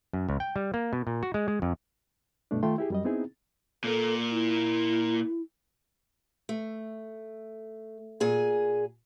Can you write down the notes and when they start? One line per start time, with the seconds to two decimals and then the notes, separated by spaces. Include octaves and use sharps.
0.13 F#2
0.29 C#2
0.40 G5
0.56 G3
0.74 A#3
0.93 B2
1.07 A#2
1.23 F#4
1.34 G#3
1.48 G#3
1.62 F2
2.51 G2 B2 A3 D4
2.63 D#3 A3 F4 G5 C6
2.78 E4 G4 G#4
2.90 F#2 G3 D#5
3.04 B3 C4 D#4 E4 G#4
3.84 A#2 A#3 A4
4.31 E4
6.49 A3
8.20 A#2 G#4 G#5